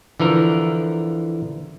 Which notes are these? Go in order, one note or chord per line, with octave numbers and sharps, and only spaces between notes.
D3 E3 F3 A#4